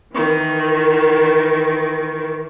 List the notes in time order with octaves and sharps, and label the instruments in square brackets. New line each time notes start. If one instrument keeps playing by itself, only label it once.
[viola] D#3 E3